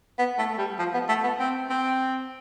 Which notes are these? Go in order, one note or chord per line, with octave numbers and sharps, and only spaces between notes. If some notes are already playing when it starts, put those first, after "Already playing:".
B3
A3
A3
G3
F3
B3
A3
B3
C4
C4